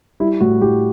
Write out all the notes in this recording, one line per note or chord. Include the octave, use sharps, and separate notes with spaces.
G3 E4
A2 F#4
A2 G4